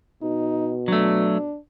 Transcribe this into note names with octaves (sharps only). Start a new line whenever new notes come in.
B2 D#4
F#3 A3 D4